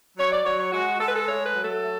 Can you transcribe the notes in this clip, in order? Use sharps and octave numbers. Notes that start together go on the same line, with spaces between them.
F#3 C#5
D5
F#3 C#5
C#5
G#3 F#4
G#3 A4
B4
A4
A3 C#5
B4
F#3
A4
A3